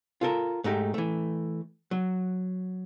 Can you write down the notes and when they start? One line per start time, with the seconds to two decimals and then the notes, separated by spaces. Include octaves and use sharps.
0.21 F4 A4 A#4
0.64 G#2 A3 D#4 G4
0.94 E3 A3
1.91 F#3